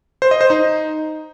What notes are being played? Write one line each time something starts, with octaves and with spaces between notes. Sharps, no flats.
C5
D#5
C5
D#4